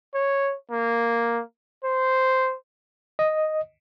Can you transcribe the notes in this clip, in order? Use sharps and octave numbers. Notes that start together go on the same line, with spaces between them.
C#5
A#3
C5
D#5